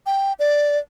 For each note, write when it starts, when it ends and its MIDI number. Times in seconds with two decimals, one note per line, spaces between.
0.06 0.33 79
0.39 0.78 74